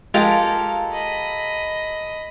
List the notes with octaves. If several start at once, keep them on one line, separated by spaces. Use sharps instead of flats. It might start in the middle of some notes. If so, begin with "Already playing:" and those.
G#3 F4 G4 A4 A#4 F5 A5
D#5 B5